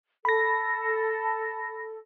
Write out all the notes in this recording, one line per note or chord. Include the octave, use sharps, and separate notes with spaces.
A4 B5 A#6